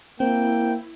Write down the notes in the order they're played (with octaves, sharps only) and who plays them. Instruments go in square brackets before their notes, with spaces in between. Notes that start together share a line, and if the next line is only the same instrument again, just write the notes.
[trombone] A#3 [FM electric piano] C4 [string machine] E4 [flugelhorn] G5